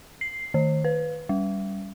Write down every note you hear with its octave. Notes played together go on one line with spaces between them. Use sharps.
C7
D#3
B4
G3